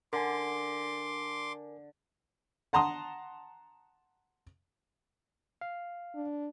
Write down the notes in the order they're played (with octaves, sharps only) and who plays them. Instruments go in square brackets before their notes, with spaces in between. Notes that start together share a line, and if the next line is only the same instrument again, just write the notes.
[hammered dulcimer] D3 [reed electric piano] A#4 G#5 [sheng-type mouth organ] C6 D6
[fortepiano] F#5 A5 A#5 C6 D#6
[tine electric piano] F5
[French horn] D4